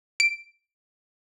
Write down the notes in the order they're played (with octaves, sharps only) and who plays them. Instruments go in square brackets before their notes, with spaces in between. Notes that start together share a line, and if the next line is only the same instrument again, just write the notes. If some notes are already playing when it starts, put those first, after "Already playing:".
[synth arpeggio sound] D7